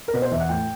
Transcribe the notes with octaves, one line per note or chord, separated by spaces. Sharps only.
A#4
B2 B4
C5
E2 E5
F#5
A2 G5